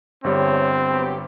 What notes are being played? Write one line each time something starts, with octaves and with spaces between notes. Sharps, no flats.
G1 E2 G3 C4 C#5
F#3 B3 G4